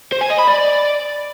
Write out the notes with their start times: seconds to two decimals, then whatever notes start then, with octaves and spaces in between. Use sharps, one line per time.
0.12 C5
0.21 G#5
0.30 D#5
0.38 B5
0.47 D5